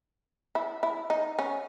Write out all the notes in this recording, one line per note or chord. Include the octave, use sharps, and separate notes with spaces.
E4
E4
D#4
C#4